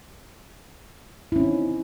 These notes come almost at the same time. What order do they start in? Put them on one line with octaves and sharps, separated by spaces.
E4 C#4 C4 D#4